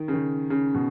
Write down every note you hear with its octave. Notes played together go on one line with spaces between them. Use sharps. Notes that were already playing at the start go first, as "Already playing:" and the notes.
Already playing: D#3
C#3
D#3
C#3
B2